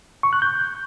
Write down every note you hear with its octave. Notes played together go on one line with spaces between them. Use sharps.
C#6
F#6
G6